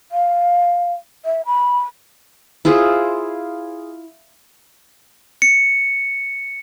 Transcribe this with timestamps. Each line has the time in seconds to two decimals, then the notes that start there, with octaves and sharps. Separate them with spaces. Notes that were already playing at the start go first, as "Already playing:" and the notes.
0.12 F5
1.25 E5
1.46 B5
2.65 E4 F4 G#4 C5
5.42 C#7